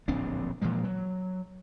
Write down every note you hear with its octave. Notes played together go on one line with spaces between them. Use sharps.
D1 A#1 C4 D4
A#2 E3 F3 G#3
F#3